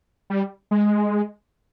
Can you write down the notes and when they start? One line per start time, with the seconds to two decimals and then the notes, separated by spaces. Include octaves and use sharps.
0.30 G3
0.71 G#3